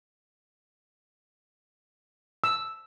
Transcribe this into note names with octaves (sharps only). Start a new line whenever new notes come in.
E6